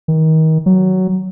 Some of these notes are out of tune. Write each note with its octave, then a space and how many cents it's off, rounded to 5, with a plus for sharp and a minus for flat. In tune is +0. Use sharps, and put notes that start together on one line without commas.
D#3 +30
F#3 +10